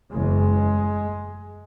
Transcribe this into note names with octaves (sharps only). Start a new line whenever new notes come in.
F#1 E2 C#3 G#3